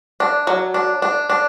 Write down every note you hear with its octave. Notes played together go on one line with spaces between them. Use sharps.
D4
F#3
D4
D4
D4